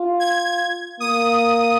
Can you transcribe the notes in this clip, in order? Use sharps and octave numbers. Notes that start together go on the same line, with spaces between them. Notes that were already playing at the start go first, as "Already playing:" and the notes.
Already playing: F4
G#6
A#3 D#6